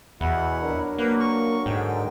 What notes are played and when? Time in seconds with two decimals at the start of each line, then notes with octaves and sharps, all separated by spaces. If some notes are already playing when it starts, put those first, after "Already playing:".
0.21 E2 B2 E4 F#5
0.62 F#3 D4 A#4
0.98 A#3 B4
1.20 C#6
1.66 G#2 D3 G5